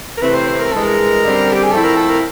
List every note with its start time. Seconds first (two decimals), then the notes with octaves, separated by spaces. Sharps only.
0.17 A#4
0.22 C3 E3 A3 C4 E4 B4
0.35 C5
0.48 C5
0.60 A#4
0.72 G2 E3 G#3 A4
0.84 A#4
1.22 F#2 D3 G3 C4
1.53 G4
1.63 G#4
1.71 F3 A3 C4 E4 A4
1.84 A#4
1.97 A4
2.10 A#4